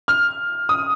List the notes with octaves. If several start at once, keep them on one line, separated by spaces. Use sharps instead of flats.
F6
D#6